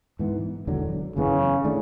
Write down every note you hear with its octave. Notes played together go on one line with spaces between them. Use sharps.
G#2 E3 B3
E1 E2 D3 F#3
F#1 F#2 C#3 E3 B3
E3 A3 D4